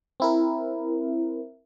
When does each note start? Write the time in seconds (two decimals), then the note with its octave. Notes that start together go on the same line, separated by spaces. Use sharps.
0.20 C4 E4 A#4